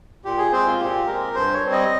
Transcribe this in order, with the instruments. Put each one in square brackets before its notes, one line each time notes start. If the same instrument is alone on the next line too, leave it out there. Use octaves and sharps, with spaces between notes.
[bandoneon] A#2 G4
G#4
G#3 C4 C5
F4
A#2 G4
G#3 C4 A#4
G2 C5
C#5
G3 C4
D#5